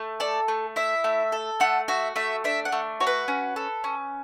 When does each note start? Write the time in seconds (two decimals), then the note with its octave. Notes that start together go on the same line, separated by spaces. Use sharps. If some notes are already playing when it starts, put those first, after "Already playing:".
Already playing: A3
0.20 A4 D5
0.48 A3
0.76 E4 E5
1.04 A3
1.32 A4
1.60 A3 F#5
1.88 F#4 E5
2.16 A3 E5
2.44 D4 E5
2.65 F#5
2.72 A3
3.00 F#4 C#5
3.07 B4
3.28 C#4
3.56 A4
3.84 C#4